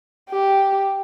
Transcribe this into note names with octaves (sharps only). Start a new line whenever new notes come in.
G4